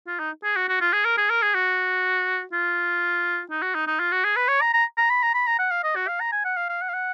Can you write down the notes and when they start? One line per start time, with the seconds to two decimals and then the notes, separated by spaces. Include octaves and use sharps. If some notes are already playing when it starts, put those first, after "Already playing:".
0.07 F4
0.19 D#4
0.44 G#4
0.56 F#4
0.69 F#4
0.81 F4
0.93 G#4
1.05 A#4
1.17 G#4
1.30 A#4
1.42 G#4
1.54 F#4
2.53 F4
3.50 D#4
3.62 F#4
3.75 D#4
3.87 D#4
3.99 F4
4.12 F#4
4.24 G#4
4.36 B4
4.48 C#5
4.61 A#5
4.73 A#5
4.97 A#5
5.10 B5
5.22 A#5
5.34 B5
5.47 A#5
5.59 F#5
5.71 F5
5.83 D#5
5.96 F#4
6.08 F5
6.20 A#5
6.32 G#5
6.45 F#5
6.57 F5
6.69 F5
6.81 F#5
6.89 F5
6.94 F#5